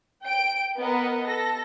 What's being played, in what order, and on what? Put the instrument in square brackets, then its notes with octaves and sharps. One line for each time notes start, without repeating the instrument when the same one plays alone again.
[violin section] G5 D7
B3 A#4 B4 D#5 F#5
A4 A#6